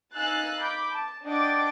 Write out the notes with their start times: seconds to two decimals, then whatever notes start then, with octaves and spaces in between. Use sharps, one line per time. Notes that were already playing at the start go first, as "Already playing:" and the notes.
0.16 D#4 F5 G#5 E6 F#6 A6
0.59 B5 D6 G6
0.92 A5
1.25 D4 D#5 F#5 G5 D6 A6